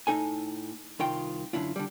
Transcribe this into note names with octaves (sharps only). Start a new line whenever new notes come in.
A2 D#4 A4 G#5
C2 D#3 F4 G5
F#2 D3 E4 F4
D3 G3